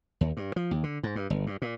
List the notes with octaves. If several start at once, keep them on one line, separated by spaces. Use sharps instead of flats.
D#2
G2
F3
D#2
D3
G#2
G2
G1
G2
A#2